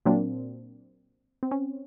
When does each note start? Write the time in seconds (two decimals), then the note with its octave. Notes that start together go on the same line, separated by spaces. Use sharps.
0.06 A#2 F#3 A#3 C4 D4
1.43 C4
1.51 C#4